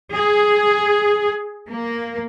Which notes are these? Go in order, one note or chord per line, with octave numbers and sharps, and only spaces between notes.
G#4
A#3